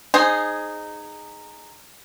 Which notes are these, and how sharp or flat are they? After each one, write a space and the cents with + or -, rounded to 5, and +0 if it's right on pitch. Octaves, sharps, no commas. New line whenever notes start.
D#4 -15 G#4 +0 C5 +0